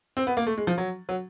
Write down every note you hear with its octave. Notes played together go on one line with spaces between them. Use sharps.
C4
B3
A#3
A3
G#3
F3
F#3
F#3